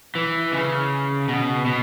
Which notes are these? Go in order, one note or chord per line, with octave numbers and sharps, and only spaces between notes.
E3
C#3
B2
B2